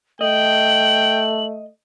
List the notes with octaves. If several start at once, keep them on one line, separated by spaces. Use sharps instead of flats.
A3 D#5 G5 F#7